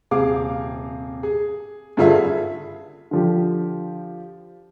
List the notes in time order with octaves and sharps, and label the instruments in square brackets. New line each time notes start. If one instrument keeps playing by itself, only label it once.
[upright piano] D#1 C3 G#4 F5 D6
G#4
G2 D3 F4 G#4 A4 E5
[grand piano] D3 F3 G4